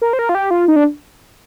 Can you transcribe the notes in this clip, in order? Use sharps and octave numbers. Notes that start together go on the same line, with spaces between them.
A#4
C5
A#4
F4
G4
F4
D#4
D4